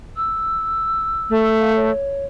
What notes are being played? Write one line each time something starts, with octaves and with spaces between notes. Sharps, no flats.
E6
A3
F5
C#5